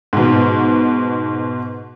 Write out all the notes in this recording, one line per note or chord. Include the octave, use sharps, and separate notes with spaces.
G#2 B2